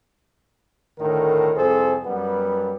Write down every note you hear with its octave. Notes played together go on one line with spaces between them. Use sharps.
D2 A2 D#3 A#4
C2 F2 G#4 A4 C5
F#2 G3 B3